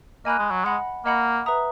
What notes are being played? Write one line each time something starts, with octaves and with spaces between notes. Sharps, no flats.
A#3 D#5 G#5 B5 F#6
G#3
F#3
G#3 D#5 F#5 B5
A#3 D#5 F#5 B5
B4 E5 A#5 D#6